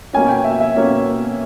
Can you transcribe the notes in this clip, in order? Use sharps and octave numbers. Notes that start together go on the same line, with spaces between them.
B2 A#3 C#4 G#5
G5
E5
E5
B2 A#3 C#4